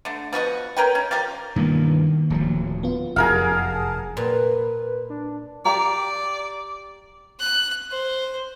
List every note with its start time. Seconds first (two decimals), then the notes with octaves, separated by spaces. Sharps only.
0.05 D3 A3
0.33 F3 B3 F#4 D#5
0.77 C#4 A#4 B4 G5
0.95 C#4
1.11 F3 G4 A#4
1.56 G2 B2 D#3 E3 A#3
2.30 D1 F3 F#3
2.83 B3 F4
3.16 F1 F#2 G#4 A#4 F5 F#5 A5
4.17 A#2 B4
5.10 D4
5.65 G4 D5 F5 A#5
7.40 F#6
7.91 C5